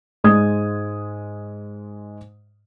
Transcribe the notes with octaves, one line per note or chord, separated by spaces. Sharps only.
G#2 G#3 D#6 G#6